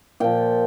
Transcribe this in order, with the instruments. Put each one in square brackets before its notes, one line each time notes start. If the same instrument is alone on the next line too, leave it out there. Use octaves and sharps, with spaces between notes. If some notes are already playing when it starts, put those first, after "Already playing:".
[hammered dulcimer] A#2 F3 G5